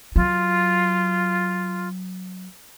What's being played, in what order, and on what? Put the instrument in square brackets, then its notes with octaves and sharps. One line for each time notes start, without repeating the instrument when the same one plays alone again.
[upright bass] F#3 [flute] F4